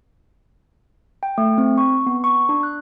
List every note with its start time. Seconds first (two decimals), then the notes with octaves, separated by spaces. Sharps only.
1.23 G5
1.38 A3
1.58 C4
1.78 C#6
2.06 B3
2.24 C#6
2.49 D4
2.63 F#6